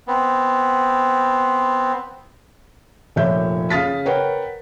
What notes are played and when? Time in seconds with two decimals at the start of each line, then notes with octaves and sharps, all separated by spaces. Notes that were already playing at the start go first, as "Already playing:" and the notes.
0.08 B3 C4
3.16 F1 A#2 F3 C#5 E5 G6
3.70 C#3 F5 D#6 A6 B6
4.05 A#4 B4 C#5 F#5 G5